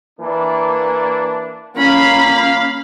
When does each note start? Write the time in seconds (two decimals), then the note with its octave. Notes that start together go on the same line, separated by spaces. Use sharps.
0.20 E3 A#3 D4
1.76 A#3 C#4 F5 B5